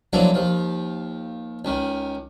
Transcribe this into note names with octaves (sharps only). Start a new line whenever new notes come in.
F3 F#3 G#3 A#3 D4 E4
D#2 F3
C#2 D#3